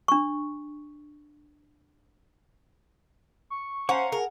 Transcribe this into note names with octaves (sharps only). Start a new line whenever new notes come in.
D4 C#6
C#6
C#4 C5 F5 F#5 A#5 C#6
G#4 A#4